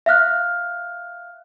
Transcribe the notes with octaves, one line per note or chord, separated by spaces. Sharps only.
E5 F5 F6 F#6